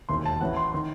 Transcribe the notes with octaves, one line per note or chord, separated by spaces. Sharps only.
E1 D#2 D#3 C6
A5
A1 A2 E3 F#5
C6
D#3 C6